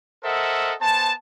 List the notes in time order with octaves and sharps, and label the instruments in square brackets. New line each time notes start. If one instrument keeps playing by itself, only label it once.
[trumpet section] A4 A#4 C5 D#5 E5 F#5
B3 C5 G#5 A5